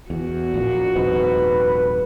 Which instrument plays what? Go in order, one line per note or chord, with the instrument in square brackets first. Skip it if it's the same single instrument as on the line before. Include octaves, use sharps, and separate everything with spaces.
[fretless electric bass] E2 [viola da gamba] F#4
[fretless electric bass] A#1 A#2
[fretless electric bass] D#1 F2 G#2 [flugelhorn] B4